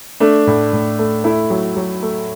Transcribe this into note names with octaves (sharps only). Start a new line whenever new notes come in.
A3 D4
A2
A2
A3
A3 E4
F#3
F#3
A3